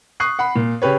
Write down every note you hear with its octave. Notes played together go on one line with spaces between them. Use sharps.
C#6 D#6 F#6 C7
F#5 B5
A#2
C#3 G4 B4 C#5